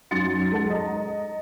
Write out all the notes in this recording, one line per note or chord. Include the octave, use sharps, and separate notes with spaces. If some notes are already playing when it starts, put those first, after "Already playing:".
F#2 D#4 C6 A6 C#7
G#3 A4 F#5
D#5 A#5